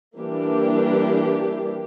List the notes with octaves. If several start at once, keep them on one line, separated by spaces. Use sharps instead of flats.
E3 G3 A#3 D4 G4